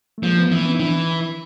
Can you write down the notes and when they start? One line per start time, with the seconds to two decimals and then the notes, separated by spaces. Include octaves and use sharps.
0.18 A3
0.23 F3 G#3 A#3
0.37 A3 B3
0.51 E3 A#3 C4
0.65 B3 C#4
0.73 D#4
0.79 E3 C4 D4